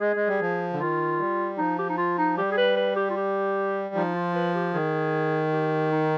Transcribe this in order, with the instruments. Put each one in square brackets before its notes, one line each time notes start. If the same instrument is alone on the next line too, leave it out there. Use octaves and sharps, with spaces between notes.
[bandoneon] G#3 [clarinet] G#4
[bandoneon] G#3
G3
F3
D3
[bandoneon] D#3 [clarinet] F4
[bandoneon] G3
[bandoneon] F3 [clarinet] D#4
[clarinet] G4
D#4
F4
D#4
[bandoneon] G3 [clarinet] G4
[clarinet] G#4
B4
B4
G4
F4
G4
[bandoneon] F3 [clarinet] D#4
[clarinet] F4
B4
G4
[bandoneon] D#3 [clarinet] G#4
[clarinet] G4
D#4